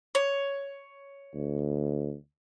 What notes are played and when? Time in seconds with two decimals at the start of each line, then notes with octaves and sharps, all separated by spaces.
0.15 C#5
1.35 D2